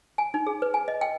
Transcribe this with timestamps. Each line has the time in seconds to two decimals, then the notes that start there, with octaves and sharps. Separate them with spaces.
0.18 G#5
0.34 D#4
0.47 G#4
0.62 B4
0.74 G#5
0.88 D#5
1.01 G5